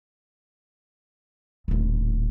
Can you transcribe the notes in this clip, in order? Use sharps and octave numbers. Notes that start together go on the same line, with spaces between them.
D#1 A2